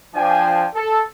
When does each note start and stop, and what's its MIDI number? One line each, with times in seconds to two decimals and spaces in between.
0.15 0.66 53
0.15 0.66 62
0.15 0.66 79
0.15 0.66 80
0.74 1.02 69